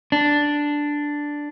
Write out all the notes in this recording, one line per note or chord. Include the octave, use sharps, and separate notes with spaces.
D4